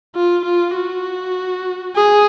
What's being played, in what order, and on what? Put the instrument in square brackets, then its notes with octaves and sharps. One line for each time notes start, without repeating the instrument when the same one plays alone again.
[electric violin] F4
F4
F#4
G#4